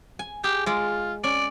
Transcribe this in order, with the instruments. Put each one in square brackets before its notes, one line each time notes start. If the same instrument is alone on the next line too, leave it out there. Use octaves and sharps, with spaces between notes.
[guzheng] G#5
[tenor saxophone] G4 [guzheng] G#4
[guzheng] G#3 D5 [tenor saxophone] F4
[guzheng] C#4 [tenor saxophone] D5